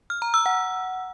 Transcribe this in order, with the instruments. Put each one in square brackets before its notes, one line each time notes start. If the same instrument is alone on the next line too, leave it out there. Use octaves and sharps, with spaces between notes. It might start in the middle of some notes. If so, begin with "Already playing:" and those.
[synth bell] F6
A#5
E6
F#5